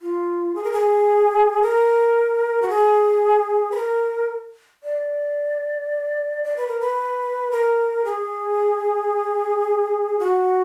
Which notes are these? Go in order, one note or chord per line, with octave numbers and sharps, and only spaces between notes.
F4
G#4
A#4
G#4
A#4
F#4
G#4
B4
A#4
D5
D5
B4
A#4
B4
A#4
G#4
F#4